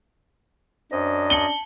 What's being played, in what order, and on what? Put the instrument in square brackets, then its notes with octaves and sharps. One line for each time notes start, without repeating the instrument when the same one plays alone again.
[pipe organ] F#2 D#5 [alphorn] D4 [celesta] C5
[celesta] A5 C#7 F#7 [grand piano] G7